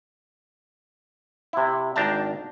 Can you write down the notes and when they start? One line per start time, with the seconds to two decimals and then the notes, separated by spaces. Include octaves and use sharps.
1.53 C3 E4
1.96 G#1 D4 G5 A5 A#5